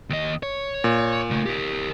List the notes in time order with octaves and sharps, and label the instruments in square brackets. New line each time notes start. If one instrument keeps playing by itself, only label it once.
[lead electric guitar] D#2 D#5
C#5
[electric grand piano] A#2
[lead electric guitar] C#3 A3
G4 A#4